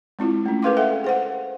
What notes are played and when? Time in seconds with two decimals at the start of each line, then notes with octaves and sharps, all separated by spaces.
0.19 G#3 C4 E4 F4
0.46 A3 C#4
0.63 G#4 A#4 B4 F5 C6 D6
0.77 A4 E5 F#5 G5
1.04 G#4 C5 F#5